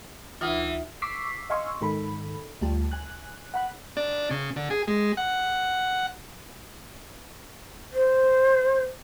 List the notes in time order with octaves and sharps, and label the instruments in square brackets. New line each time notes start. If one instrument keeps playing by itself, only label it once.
[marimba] D2 D#4 F4 [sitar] E3
[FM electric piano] C#6 D6 E6 B6 C7
D#5 F5 G#5 C6 C#6 E6
G#2 D#3 A4 B5
D2 G3 F4 G4 A5
G#5 F#6
F#5 B5 F#6
[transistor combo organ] D4
C#3
D3
G#4
G#3
F#5
[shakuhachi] C5